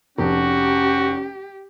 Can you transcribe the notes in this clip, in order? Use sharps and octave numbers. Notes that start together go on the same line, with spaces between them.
F1 C#4 F#4 G4